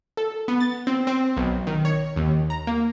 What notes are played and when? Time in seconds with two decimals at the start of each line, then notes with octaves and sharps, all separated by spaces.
0.17 A4
0.48 B3
0.61 A6
0.87 C4
1.07 C4
1.37 B1
1.67 D#3
1.85 C#5
2.16 D#2
2.50 A#5
2.67 A#3